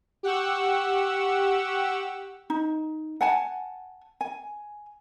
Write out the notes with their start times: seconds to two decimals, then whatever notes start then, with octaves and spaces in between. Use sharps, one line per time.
0.23 G4 F#5 C#6 E6
2.50 D#4
3.21 F#5 G#5 A5
4.21 G#5